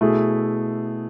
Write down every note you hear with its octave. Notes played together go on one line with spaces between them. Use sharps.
B2 A3 E4 G#4